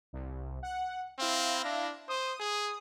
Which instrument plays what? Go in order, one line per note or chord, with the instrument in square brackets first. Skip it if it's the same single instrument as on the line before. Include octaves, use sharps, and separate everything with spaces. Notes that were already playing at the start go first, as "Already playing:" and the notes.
[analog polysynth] C2
F#5
[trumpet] C4 [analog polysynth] E4 F5 A#6
[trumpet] D4
[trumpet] C5 [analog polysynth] D#6
[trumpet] G#4